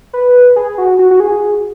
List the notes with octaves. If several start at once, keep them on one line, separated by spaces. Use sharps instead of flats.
B4
G#4
F#4
F#4
F#4
G#4